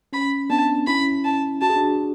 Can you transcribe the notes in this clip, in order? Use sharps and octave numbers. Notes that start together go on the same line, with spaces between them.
C#4 B5
B3 D4 A5
C#4 E4 B5
A5
F#4 A5
G#4
D4 F#4